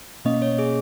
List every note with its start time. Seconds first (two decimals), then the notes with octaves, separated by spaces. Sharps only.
0.25 B2 A#3 C#4 D#5
0.42 C#5
0.59 G#4